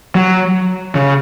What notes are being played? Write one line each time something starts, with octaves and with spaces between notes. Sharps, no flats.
F#3
C#3